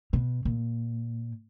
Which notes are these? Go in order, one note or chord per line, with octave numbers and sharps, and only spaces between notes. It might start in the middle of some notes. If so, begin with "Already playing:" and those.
B2
A#2